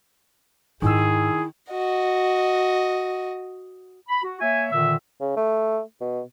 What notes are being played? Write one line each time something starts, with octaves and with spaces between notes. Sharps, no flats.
G#2 D#3 E4 F4 G#4 E6
F#4 D#5
B5
F#4
A#3 C#5 E5 G#5
A#2 D3 D#3 E5
C#3
A3
B2